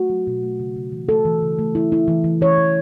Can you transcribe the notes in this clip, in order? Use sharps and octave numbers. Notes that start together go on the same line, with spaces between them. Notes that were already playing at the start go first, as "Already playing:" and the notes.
Already playing: A3 F#4
F#3
B2
A3
C#3
C#3
E3
A3 A4
E3
C#3
A3
E4
E4
E3
E3
E3 C#5
E3